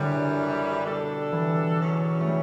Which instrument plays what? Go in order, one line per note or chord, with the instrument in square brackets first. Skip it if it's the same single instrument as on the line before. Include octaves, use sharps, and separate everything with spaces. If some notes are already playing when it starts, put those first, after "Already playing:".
Already playing: [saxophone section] F#2 E3 G3 [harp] D3
[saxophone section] B2 G3 D4 A4
[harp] E3
[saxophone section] E2 B2 F#3 C#4
[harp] A3
G3